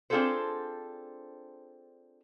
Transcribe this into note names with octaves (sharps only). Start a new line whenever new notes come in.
C4 D4 F4 G#4 A4 C5